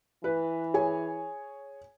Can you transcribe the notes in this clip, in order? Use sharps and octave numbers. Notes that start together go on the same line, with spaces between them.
E3 B4
G#4 C#5 G#5